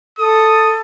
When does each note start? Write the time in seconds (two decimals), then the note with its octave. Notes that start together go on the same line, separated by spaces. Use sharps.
0.19 A4 D#6